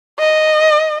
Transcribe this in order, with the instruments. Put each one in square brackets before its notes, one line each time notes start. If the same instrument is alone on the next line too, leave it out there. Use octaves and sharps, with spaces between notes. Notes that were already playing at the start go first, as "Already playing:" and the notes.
[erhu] D#5